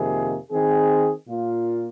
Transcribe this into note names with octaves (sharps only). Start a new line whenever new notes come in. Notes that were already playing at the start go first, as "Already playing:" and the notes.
Already playing: F2 C3 D#3 A#3 G#4
D#3 C4 G#4
A#2 A#3 F4